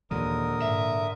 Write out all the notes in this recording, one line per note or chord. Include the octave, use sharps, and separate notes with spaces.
D#2 A#2 D3 E3 G#3 A#4 D#6
G#2 E5